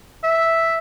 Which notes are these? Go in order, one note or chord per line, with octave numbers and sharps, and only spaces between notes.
E5